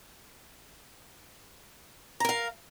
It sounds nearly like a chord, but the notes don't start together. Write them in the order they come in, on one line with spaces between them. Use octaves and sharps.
A#5 A#4 F5